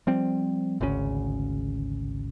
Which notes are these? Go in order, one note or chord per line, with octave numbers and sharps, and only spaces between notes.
F3 G3 C4
G#1 D2 C#3 C#4